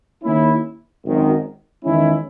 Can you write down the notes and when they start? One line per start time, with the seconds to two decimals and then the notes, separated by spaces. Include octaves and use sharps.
0.24 D#2 D#3 A#3 C#4 E4
1.04 G#1 F#2 D#3
1.84 E2 D#3 G#3 C#4 E4